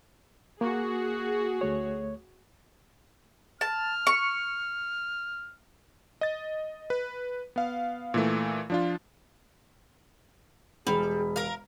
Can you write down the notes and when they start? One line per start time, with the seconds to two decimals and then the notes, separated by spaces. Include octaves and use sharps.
0.61 A#3 F#4 G#4
1.61 D2 A3 C#5
3.61 A5 F6
4.07 C#6
6.21 D#5 A6
6.90 B4
7.56 B3 F5
8.14 A#2 E3 A3
8.70 F3 D4 F4
10.87 E1 G3 G#4 B5
11.36 A#4 F5